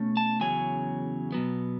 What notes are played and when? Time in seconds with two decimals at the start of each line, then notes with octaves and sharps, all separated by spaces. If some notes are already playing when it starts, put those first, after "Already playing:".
Already playing: B2 A3 C#4
0.17 A5
0.40 E2 C#3 F#3 C#4 G#5
1.32 B2 F#3 B3